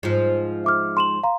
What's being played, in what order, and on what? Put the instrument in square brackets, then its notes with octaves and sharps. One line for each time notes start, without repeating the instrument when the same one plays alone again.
[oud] G#2 F3
[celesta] E5 D6 F6
C6 E7 F#7
F5 A#5 C6